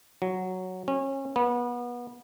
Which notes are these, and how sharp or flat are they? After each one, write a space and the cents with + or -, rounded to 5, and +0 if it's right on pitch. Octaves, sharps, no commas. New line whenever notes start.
F#3 +0
C#4 -30
B3 -30